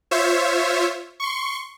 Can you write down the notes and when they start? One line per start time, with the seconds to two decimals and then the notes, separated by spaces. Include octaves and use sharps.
0.11 F4 C5 C#5 E5
1.20 C6 C#6